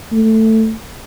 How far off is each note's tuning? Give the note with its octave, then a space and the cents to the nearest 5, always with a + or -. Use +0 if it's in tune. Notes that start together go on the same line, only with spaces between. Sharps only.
A3 +10